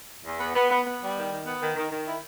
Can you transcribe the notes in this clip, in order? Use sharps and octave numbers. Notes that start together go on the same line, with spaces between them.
E2
B3
B3
B3
B3
G3
D#3
D#3
B3
D#3
D#3
D#3
E4